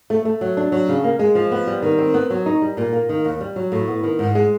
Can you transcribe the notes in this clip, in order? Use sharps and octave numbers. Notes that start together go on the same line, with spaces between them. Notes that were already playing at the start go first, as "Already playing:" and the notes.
A3
A3
F#3
D4
F#3
C#3
A#3
G#3
F3
B3
G3
D#3
C4
B3
F#3
D#4
G3
A#2
A#3
D#3
D#2
G3
F#3
A2
B3
D#3
G#2
G#3